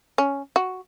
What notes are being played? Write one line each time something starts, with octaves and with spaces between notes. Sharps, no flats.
C#4
F#4